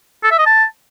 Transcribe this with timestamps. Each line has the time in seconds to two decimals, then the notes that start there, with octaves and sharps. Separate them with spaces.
0.24 A4
0.31 E5
0.39 D#5
0.46 A5